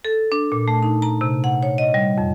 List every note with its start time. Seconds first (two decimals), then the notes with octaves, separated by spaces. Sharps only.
0.05 A4
0.32 D4
0.52 A#2
0.68 A3
0.83 D#4
1.02 A#5
1.21 C3
1.44 F#5
1.63 C#5
1.78 D#5
1.94 G3
2.18 F2